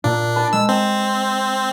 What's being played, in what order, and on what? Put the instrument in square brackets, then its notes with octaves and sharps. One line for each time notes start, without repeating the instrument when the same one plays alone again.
[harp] A#2 [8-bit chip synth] D4
[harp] B4 A5 B5
[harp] G#3 [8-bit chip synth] E6
[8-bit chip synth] C4